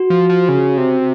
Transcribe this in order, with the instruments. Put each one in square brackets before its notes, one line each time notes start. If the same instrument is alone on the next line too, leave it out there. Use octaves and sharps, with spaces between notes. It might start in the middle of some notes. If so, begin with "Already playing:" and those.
Already playing: [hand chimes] F#4
[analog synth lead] F3
F3
C#3
C3